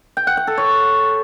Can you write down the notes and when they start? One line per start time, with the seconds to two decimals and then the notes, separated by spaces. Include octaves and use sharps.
0.17 G5
0.27 F#5
0.37 F#5
0.47 A4
0.58 C#5